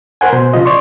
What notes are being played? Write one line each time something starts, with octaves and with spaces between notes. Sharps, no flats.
A#4 C5 F#5 G#5
B2 C5
C#3 F3 F4 D#5
D5 C6 C#6